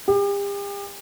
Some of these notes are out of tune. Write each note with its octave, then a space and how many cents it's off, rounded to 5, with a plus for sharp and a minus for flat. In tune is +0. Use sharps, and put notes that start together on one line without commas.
G4 +40